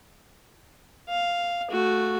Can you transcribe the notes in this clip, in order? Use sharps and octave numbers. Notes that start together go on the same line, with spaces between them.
F5
A3 F#4